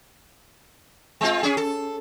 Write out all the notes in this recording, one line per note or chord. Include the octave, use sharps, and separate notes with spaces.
G#3 C4 F4
C#4 G#4
A4